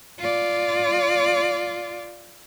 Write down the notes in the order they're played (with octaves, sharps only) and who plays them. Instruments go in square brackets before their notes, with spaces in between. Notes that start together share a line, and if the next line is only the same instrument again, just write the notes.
[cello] F4 D5